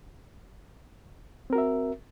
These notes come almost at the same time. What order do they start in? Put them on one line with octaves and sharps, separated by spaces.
C4 A#4 F#4 E5